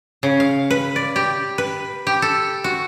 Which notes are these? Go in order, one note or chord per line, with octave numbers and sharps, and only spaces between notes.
C#3
F5
B4
D5
G4
B4
G4
A4
F#4